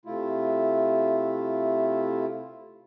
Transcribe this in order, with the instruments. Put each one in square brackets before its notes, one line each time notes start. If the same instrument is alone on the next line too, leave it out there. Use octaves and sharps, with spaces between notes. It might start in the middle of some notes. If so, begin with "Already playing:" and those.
[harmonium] C3 A3 E4 F4